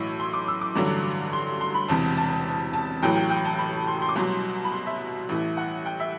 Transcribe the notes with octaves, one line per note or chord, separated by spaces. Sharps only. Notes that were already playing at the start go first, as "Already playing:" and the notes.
Already playing: B1 A2 E3 E6
C6
D6
E6
D6
A1 G2 D3 F#3
C6
C6
B5
E1 E2 C3 A5
A5
A5
A1 A2 F#3 G5
G5
G5
A5
B5
C6
C6
D6
C2 B2 F#3 C6
B5
C6
E5
A1 A2 E3
F#5
G5
E5